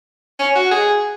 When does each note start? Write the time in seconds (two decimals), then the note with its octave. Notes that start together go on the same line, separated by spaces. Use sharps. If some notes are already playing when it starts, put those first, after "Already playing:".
0.39 C#4
0.55 F#4
0.71 G#4